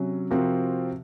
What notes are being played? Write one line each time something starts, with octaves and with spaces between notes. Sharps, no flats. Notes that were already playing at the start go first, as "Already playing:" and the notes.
Already playing: C3 F#3 C#4 F#4
C3 F3 C4 F#4 A#4